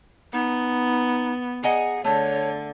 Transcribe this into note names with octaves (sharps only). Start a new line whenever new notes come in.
B3 D#4
G#4 D#5 F#5 G#5 A#5
D3 A3 C#5